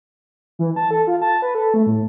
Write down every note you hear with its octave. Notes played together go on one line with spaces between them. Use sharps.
E3
A5
A4
F4
A5
B4
A4
A3
A2